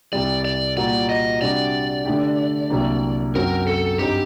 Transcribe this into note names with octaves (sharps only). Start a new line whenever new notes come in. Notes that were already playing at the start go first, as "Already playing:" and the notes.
C2 C3 G3 D5
D5
A#2 G3 A#3 F#4 D5
D#5
C3 G3 D4 F#4 D5
D3 A3 D4 G4
C2 C3 F#3 A#3 D4
F#2 F#3 C4 F#4 A#4
A4
G2 F#3 C4 D#4 G4